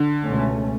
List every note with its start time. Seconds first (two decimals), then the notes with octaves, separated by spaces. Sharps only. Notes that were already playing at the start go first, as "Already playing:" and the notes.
Already playing: D3
0.22 C#2 B2 A3 C#4